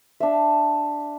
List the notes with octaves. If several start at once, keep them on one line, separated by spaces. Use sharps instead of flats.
D4 E5